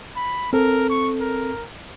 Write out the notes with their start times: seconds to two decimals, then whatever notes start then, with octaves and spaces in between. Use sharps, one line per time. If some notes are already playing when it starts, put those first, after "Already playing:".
0.16 B5
0.53 C4 A4 A#4
0.90 C#6
1.21 A#4